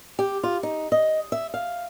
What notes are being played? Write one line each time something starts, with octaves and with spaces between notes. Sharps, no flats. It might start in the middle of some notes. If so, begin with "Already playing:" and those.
G4
F4
D#4
D#5
E5
F5